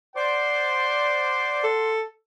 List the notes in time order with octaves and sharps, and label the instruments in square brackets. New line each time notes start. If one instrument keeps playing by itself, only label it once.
[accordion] C5 D5 D6 [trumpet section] F#5 C6
[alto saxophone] A4